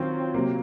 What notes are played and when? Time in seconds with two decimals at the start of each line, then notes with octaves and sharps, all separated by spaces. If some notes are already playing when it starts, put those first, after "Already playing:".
Already playing: D#3 F#3 C4 C#4 F4
0.34 C3 F#3 A#3